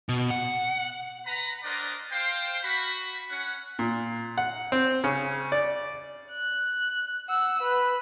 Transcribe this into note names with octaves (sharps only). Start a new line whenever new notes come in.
B2
F#5
B4 A#5 B5
D4 A#4 C5 D5 D#5 F#5
C5 F5 G5
F#4 B5
C#4 F#5
A#2
F#5
C4
C#3
D5
F#6
F#5 E6
B4